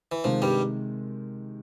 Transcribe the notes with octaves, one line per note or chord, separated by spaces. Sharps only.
E3
C3 D#3 F3 G#3
G2 G3